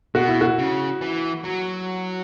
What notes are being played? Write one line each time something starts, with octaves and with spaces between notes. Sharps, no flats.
B2 F#4
E4
F#4
C#3
E3
F#3